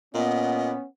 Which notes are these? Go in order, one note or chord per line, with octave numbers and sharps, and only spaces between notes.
A#2 B3 C#4 D#5